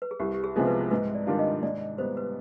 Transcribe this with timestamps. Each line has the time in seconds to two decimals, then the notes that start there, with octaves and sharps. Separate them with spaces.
0.02 B4
0.11 G#4
0.20 C2 G4
0.34 G4
0.44 G#4
0.56 C3 F3 G#3 B3
0.67 B4
0.91 G#2 B4
1.15 D5
1.27 D#3 G3 D4 F4
1.39 D#5
1.63 G#2 D5
1.98 G3 B3 C5
2.17 B4